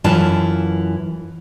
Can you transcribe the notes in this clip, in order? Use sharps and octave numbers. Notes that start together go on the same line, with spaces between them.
F#2 E3 F4 A5